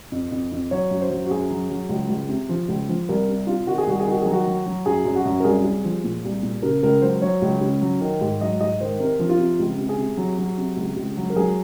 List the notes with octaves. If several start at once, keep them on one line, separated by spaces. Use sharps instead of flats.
F2
F2
F2
F#3 C#5
F#2
C5
F#3
F#4
F#2 G#4
F#3
F#3
C#2
C#2
C3
F3
C#2
F3
C2 A#4
C3
C3 F4
D#3 F#4
G#4
C2 F#4
G#4
D#3 F#4
F#3 G#4
F#4
F#3
F#3
F#2 G#4
F#2
F#4
F#2
A#4
C2 G#4
C2
F3
A#2
C2
A#2
C#3 A#4
C#2 A#4
F#3 C5
F#3 C#5
C#2
C#3
F#3
D#3
G#2
F#3 D#5
G#2 D#5
D#3 C5
C3 A#4
F3
F4
C3
C#2
C3
G#4
C3
F#3
F#3
C3
C#2
C#2
F#3
A#4
F#3 G#4